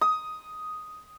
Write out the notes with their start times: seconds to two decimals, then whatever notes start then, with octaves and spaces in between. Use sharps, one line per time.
0.01 D#6